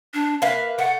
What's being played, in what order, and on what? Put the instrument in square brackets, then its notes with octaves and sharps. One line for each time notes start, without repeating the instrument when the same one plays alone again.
[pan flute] D4
[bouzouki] A#3 B4 F5 [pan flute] E5
[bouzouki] A3 [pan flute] F#5